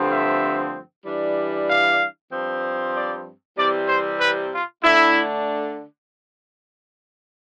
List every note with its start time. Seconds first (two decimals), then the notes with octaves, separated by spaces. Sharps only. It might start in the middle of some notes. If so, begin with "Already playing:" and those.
Already playing: G2 D3 F3 A3 C4
0.11 E5
1.05 E3 G3 D4
1.68 F5
2.31 G2 F3 C4
2.94 D5
3.57 C3 E3 G3 C4 D5
3.88 C5
4.20 B4
4.52 F4
4.83 D3 A3 D4 E4